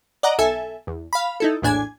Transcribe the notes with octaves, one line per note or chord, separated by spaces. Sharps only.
D5 D#5 F#5 A#5
B1 A4 E5 G#5
E2
F5 B5
D#4 E4 A4
A#1 E2 A2 D4 G#5 G#6